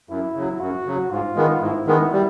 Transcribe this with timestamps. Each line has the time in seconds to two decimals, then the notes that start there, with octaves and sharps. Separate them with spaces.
0.09 F#2 E4
0.35 C#3 F#3
0.60 F#2 F#4
0.86 C#3 F#3
1.11 G#2 F4
1.36 D#3 G#3 B3
1.61 G#2 E4
1.87 D#3 G#3 B3
2.12 G3